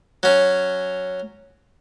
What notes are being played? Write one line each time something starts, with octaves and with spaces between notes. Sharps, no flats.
F#3 C#4